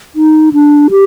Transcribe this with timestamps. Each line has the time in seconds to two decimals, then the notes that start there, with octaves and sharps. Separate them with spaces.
0.16 D#4
0.53 D4
0.91 G4